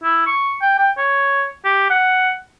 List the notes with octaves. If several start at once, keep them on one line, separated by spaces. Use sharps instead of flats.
E4
C#6
G5
G5
C#5
G4
F#5